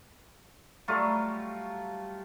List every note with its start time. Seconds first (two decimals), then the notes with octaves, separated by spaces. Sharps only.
0.88 F#3 G3 A3 F4